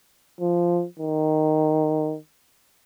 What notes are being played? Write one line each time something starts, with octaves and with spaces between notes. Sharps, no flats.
F3
D#3